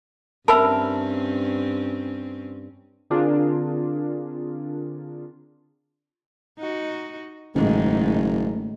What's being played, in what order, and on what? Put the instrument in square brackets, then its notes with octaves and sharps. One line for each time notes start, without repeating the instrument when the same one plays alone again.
[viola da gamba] G2 C4 C#4 [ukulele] A#4 E5 [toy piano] A5 B5 E6
[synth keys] D3 C4 D4 F4 G#4 A#4
[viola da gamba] D#4 F#4
[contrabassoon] F#1 [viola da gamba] G#2 D#3 A3